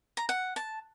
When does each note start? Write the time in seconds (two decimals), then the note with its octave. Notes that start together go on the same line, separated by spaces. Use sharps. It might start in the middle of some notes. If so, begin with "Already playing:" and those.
0.17 A#5
0.29 F#5
0.56 A5